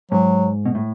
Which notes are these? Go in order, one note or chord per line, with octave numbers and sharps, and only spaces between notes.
G#2 F#3
B2
A2